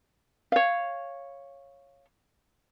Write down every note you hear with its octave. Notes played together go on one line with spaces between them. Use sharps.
C#5 F5